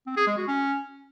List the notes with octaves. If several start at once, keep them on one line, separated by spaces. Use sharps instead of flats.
C4
G#4
G#3
F#4
C#4